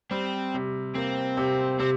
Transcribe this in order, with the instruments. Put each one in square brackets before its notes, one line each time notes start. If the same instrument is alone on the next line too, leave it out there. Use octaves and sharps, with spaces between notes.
[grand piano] G3 [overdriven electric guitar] C4
[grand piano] C3
[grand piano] A#3 [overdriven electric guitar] C4
[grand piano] C3
[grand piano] C3 [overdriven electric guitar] C4